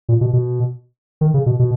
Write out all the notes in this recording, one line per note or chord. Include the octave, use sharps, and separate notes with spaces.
A#2
B2
B2
D#3
C#3
B2
B2